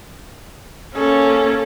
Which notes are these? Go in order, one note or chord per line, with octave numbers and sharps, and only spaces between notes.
A#3 C#4 A4